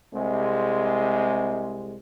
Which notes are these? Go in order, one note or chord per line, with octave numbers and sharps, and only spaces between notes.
C2 C3 G#3